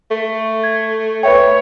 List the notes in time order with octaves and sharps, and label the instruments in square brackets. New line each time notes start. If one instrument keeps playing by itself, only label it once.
[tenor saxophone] A3
[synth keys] G#6
[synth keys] B4 E5 G5 [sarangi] C#5